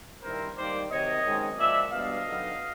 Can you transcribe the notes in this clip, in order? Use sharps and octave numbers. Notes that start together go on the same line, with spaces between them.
G2 D#3 G3 C4 E4 A#4 C5
D#3 G3 A#3 D#4 C5 D5
C3 D#3 F#3 C#5 D#5
F#2 D#3 G#3 C4
A#2 F3 G#3 D5 E5
B2 G3 B3 D4 D#5 F5
D3 F#3 B3 D#4